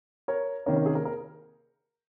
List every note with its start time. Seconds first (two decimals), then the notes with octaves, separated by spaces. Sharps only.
0.28 A#4 C#5
0.66 C3 D#3 A#3 C#4 A#4 C#5
0.76 A#4
0.86 G#4
0.95 A#4
1.05 A#4